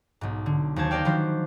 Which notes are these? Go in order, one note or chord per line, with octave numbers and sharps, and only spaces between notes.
B1 G#2
D3
D#2 F#3 G#4 C5 A5 G#6
A#4 C5 D5 F5 G5
D#3 F3 F#3 D4 B4 C5